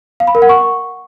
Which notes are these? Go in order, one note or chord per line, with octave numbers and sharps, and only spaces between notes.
F5
B5
A#4
F#5
C#6